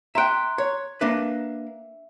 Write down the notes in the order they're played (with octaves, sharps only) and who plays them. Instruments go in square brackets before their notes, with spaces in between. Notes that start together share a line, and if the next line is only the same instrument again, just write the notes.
[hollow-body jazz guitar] E5 G5 [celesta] A#5 C6 F#6
[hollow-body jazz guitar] C#5
[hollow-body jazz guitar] A#3 D4 B4 [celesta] E5